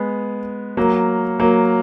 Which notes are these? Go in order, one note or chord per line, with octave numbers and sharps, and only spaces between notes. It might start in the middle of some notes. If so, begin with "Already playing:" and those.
Already playing: G#3 B3
F#3 A#3
F#3 A#3